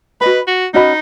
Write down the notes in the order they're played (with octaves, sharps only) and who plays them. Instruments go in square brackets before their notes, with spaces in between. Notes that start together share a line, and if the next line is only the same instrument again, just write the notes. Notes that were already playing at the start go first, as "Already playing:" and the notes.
[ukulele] F#4 D#5 B5 [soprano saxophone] B4
[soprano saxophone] F#4
[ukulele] C#4 F#4 D#5 B5 [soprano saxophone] D#4